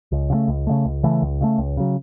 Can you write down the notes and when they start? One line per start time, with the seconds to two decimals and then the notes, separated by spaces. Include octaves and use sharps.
0.12 C#2
0.30 C#3 E3 A3
0.48 C#2
0.67 C#3 E3 A3
0.85 C#2
1.03 C#3 E3 A3
1.22 C#2
1.41 C#3 E3 A3
1.58 C#2
1.77 C#3 F#3